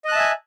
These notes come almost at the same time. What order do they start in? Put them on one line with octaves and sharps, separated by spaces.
D#5 F#6 A5 E5 G#5